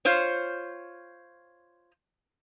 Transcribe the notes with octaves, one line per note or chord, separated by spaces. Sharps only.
F4 C5 C#5